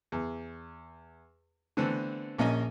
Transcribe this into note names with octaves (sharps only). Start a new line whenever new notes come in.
E2
D3 E3 A3 B3 C4
A#1 A#3 C#4 D#5